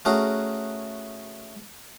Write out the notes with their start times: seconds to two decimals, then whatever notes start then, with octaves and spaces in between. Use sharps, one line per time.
0.05 A3 C#4 F#4 G#4 A#4